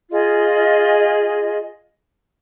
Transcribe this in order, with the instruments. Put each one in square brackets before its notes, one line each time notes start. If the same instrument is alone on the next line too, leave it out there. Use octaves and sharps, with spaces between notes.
[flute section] F4 G#4 D#5